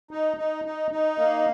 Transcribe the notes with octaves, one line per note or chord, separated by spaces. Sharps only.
D#4
D#4
D#4
D#4
A#3